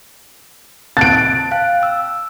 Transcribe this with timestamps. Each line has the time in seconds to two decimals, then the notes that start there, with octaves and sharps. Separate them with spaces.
0.97 C4 A5 F#6 A6 D7
1.51 F5 G5 F#6
1.83 E6